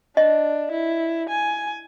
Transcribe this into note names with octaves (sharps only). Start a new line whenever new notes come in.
D4 D#5
E4
G#5